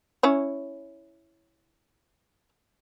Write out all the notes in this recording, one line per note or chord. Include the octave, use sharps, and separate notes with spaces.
C#4 E4 C#5